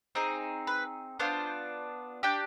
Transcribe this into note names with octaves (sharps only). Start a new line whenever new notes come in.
C4 D#4 G#4
B4
B3 D4 F4 C5
D4 G4 G5